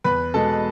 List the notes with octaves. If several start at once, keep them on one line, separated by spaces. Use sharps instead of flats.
E2 B4 B5
B2 G#3 A4 A5